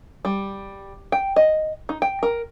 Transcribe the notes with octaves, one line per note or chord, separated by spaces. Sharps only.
G3
G5
D#5
D#4
G5
A#4